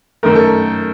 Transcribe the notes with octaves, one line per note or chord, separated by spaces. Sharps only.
F#2 D#3 A3 A#4
A4